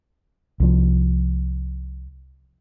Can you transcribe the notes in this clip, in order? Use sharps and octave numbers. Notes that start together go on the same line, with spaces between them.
C2 F3